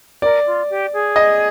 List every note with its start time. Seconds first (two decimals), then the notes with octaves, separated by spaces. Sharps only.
0.22 A#4 D5
0.46 F4
0.70 G4
0.93 G#4
1.16 D#5